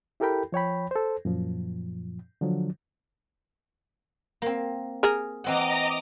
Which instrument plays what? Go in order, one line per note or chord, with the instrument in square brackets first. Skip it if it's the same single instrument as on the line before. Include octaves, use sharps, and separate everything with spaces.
[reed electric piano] E4 G4 A4 A#4 G5 B5
F3 C#5 G5 B5
A4 C5
F#2 A#2 F3
D3 F3 F#3
[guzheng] A#3 C4
[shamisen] G#4 A#4
[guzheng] E3 C4 F#5 [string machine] D#5 A#5 D6